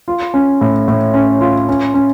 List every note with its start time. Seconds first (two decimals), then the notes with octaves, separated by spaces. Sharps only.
0.08 F4
0.34 C#4
0.61 A2
0.88 A2
1.14 C#4
1.41 F4
1.69 C#4
1.94 C#4